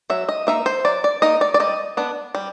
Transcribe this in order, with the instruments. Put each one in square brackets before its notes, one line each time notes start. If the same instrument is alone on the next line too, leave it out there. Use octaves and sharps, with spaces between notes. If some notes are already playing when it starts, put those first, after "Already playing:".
[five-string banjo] F#3 E5
D#5
A#3 D#4 E5
C5
F#3 D5
D5
A#3 D#4 D#5
D5
D5
G3 D#5
B3 D4
G3